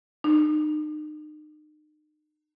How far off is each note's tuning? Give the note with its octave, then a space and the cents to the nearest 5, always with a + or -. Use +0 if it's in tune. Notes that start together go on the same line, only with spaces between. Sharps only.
D#4 -40